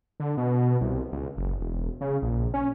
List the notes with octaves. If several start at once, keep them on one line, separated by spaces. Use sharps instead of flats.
D3
B2
C2
C#2
F#1
E1
C#3
A#1
C#4